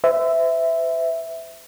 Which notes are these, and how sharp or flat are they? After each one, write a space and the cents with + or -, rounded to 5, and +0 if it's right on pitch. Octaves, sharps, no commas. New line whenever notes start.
C5 -45 E5 +0